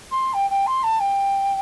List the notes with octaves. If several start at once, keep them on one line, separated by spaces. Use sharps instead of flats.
C6
G5
G5
C6
A5
G5